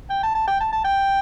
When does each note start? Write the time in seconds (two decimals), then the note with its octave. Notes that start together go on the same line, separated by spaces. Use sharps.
0.10 G5
0.23 A5
0.35 A5
0.48 G5
0.60 A5
0.72 A5
0.85 G5